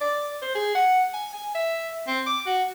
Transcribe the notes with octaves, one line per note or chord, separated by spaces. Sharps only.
D5
C5
G#4
F#5
G#5
G#5
E5
C4
D6
F#4